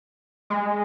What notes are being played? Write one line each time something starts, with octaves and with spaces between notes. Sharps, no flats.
G#3